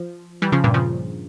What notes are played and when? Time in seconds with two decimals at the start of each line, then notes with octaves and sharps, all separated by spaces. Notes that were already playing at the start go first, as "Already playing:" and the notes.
Already playing: F3
0.42 E3 G3
0.52 C#3 F3
0.64 G2 A#2
0.74 C#3 F3